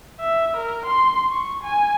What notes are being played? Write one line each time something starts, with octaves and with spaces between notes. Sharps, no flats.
E5
A#4
C6
C#6
G#5